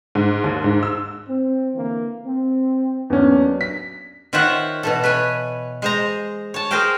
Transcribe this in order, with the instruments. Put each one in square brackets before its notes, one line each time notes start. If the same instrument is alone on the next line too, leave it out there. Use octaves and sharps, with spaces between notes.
[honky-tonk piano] G#2
D#2
G#2
E6
[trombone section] C4
D3 E3 A#3
C4
[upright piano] E2 C#4 [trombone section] F#3 A#3 D4
[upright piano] B6
[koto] D#3 F4 C5 C#5 E5 F#5
B2 E3 A4
B4 C#5 G#5
G#3 C5 A#5
C#5 A5
G#4 A#4 C5 F5 G5